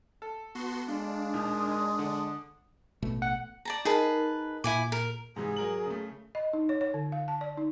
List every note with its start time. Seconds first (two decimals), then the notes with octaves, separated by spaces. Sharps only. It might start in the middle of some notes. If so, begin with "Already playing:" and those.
0.22 A4
0.55 B3 F#4 C6
0.88 G#3 D4 F5
1.34 D#2 A#2 D#3 D#6
1.68 D#6
1.99 D3
3.02 A1 B2 A3
3.22 F#5
3.65 D5 A5 A#5
3.85 D#4 G#4 A#4 B4 A5
4.64 A#2 E4 G#5 D6
4.92 A#4
5.36 G#2 C3 E3 G#4
5.56 F#3 A#4 F#7
5.86 C#3 A3
6.35 D#5
6.53 D#4
6.69 C#5
6.81 C#5
6.94 D3
7.12 F5
7.28 A5
7.41 D5
7.57 D#4